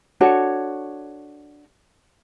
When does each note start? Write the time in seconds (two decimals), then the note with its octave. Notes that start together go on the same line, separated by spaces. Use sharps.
0.21 D4 F#4 A4 C#5